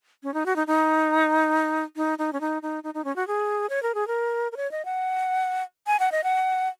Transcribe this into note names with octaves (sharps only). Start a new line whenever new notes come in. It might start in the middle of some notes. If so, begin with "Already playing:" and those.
C#4
D#4
F#4
D#4
D#4
D#4
D#4
C#4
D#4
D#4
D#4
D#4
C#4
F#4
G#4
C#5
A#4
G#4
A#4
A#4
C#5
D#5
F#5
G#5
F#5
D#5
F#5